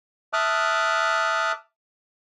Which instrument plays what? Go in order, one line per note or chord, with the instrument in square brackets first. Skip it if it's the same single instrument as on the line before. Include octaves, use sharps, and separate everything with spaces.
[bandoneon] E5 A5 D6 D#6 F6 F#6